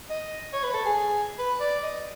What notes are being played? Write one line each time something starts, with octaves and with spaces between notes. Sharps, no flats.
D#5
C#5
B4
A4
G#4
B4
D5
D#5